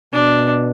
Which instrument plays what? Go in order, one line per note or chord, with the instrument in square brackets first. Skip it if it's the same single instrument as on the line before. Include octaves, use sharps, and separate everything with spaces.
[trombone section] B2 [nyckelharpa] D4